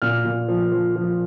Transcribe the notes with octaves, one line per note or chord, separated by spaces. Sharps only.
A#2 F6
A#2
F3
F3
F3